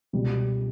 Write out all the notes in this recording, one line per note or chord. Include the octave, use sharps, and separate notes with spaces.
C#2 B2 G3